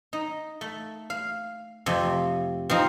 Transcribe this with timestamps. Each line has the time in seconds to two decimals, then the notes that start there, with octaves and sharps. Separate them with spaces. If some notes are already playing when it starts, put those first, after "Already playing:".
0.13 D#4
0.61 A3
1.10 F5
1.86 F2 C3 A3
2.70 F3 C4 D#4